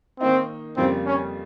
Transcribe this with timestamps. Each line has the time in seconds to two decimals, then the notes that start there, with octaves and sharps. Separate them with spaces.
0.20 D#3 A#3 C4 D#4
0.77 F2 C#3 G3 A#3 C4
1.06 C#4